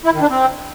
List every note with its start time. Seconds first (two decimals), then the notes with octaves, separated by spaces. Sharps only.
0.05 E4
0.13 D#3
0.22 D4
0.30 C4